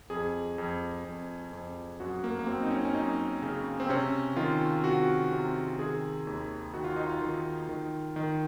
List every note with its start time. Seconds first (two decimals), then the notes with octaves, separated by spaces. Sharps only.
0.10 F2 G#4
0.58 F2
1.05 F2
1.53 F2
2.00 F#2 F#4
2.24 A#3
2.39 A#3
2.47 F#2 C4
2.63 D#4
2.71 C#4
2.85 C#4
2.95 F#2 D#4
3.42 C#3
3.80 C4
3.89 C3 C#4
4.36 D#3 F4
4.84 C3 F#4
5.32 C3
5.79 D#3 G#4
6.27 D#2
6.74 D#3 F#4
6.84 F4
6.96 D#4
7.07 F4
7.22 D#3
7.69 D#3
8.16 D#3